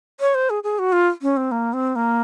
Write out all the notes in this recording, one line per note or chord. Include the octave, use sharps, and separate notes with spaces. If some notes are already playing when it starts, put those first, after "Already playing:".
C#5
C5
G#4
G#4
F#4
F4
C#4
C4
A#3
C4
A#3